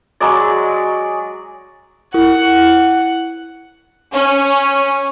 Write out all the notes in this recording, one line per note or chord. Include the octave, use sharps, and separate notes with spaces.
F#3 G#3 D5
E4 F#5
C#4